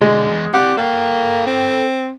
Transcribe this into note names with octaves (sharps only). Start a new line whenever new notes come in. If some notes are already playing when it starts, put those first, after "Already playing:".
B2 D3 G#3
E2
C4 G4 D5 F#5
A#3 A4 G5
C4